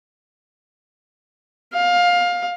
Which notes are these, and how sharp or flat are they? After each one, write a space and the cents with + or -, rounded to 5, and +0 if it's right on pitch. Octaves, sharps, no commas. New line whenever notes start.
F5 +20